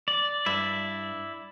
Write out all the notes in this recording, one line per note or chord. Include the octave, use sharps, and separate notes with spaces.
D5
G2 E4